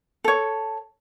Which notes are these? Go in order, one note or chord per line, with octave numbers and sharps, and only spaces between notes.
A4 C#5